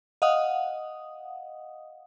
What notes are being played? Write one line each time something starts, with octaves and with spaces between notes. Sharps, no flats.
D#5 F5 F#5 D#6